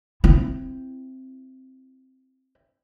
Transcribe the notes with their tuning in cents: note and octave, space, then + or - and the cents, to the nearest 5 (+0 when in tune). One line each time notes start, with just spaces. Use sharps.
C4 +0 E4 +20